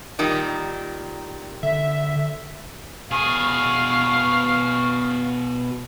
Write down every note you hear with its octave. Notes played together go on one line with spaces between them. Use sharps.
A#2 D#3 G3
D3 E5
B2 G#4 F5 C#6